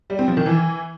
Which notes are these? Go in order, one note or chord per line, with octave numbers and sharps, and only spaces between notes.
G3
C4
F3
D#3
E3